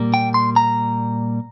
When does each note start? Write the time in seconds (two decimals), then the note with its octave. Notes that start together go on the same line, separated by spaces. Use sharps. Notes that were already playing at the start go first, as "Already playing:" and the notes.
Already playing: A#2 G3 A#3
0.14 G5
0.34 C6
0.56 A#5